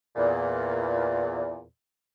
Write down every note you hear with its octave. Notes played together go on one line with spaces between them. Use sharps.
E2 A#2